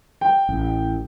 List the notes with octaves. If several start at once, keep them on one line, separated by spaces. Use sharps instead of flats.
G5
A1